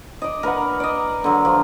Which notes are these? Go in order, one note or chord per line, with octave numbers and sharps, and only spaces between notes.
D5 D#5
A#4 B4 D5 F#5
D5 D#5
D3 F#3
F3